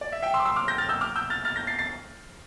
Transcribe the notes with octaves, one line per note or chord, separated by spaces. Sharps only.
D5
E5
E5 G5
C6 E6
D6
C6 E6
D6 F6
G6 A#6
F6 A6
E6 G6
D6 F6
E6 G6
F6 A6
F6 A6
G6 A#6
A6 C7
A6 C7